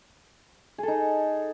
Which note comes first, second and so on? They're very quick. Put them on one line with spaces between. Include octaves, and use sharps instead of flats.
G#4 A4 D#4